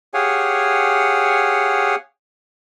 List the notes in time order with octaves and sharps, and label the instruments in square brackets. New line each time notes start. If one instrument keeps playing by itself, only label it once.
[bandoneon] G4 G#4 C#5 F5 F#5 G#5